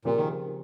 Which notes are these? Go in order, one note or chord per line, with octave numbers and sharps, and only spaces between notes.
A#2 C#3 F3 C4 G4 A#4
D#3